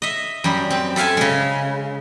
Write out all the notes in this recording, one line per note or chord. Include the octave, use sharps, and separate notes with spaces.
D#5 E5
F#2 G3
C4
A4 E5 F5 G#5 A5
C#3 G#3